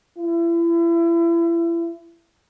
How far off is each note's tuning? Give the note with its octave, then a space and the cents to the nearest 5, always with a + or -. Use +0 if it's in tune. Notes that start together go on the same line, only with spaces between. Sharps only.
E4 +35